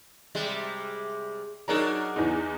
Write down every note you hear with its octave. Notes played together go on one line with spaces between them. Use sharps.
C3 G3 G#3
F#3 D4 D#4 G#4 A#4 A#5
E2 E3 D#4